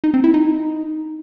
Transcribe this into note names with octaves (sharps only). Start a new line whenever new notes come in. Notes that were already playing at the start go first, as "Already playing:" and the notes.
D#4
C4
E4
D#4